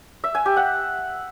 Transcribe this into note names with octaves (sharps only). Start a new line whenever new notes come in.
E5
G#5
G4
F#5